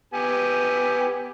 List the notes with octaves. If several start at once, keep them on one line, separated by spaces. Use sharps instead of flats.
B3 G4 G#5